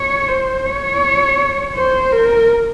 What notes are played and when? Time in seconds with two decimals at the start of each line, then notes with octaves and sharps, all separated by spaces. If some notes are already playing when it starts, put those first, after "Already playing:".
Already playing: C#5
0.29 C5
0.66 C#5
1.75 C5
2.12 A#4